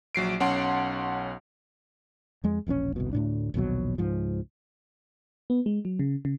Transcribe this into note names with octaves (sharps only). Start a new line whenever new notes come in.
A#1 F#3 C7 D7
B1 C#4 F#5 A5 C6 D7
F2 G#3
E1 A#1 B3 C#4
G1 C2 B2
D2 A2 D4
A#1 D#2 B2 F#3
C#2 G#2 F3
B3
G#3
F#3
C#3
C#3